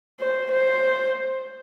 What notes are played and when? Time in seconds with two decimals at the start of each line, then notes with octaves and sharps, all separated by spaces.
0.20 C5
0.52 C5